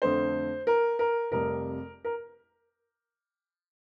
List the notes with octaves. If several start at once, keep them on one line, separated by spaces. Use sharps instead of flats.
F2 D3 A3 C5
A#4
A#4
F1 F2 C3 G3 A#4
A#4